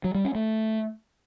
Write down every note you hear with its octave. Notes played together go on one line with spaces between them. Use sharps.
F#3
G3
C#4
A3